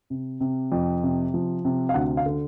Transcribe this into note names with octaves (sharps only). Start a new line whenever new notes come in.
C3
C3
F2
C3
F3
C3
F5
D2 F#5
F5
D3